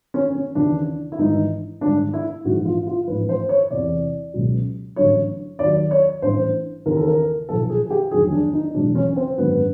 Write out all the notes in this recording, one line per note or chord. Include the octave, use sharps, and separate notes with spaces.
C#4
C#4
D#2 C#3 E3 D4
E4
G#1 G2 E3 D#4
G#1 G2 D3 D4
E4
A#1 G#2 E3 F#4
F4
F4
A1 G#2 F3 B4
C5
C#5
E2 C3 E3 D5
C#2 B2 F#3
A1 G2 D3 F#3 C#5
D#2 D#3 F#3 D5
C#5
A1 G2 E3 C5
D#2 C#3 E3 A#4
A4
A#4
B1 A#2 F3 A4
G#4
G#4
G4
F1 D#2 D3 F#3 G#4
D4
D#4
E1 E2 C#3 F#3 D4
C#4
C4
G#1 F#2 D3 F#3 B3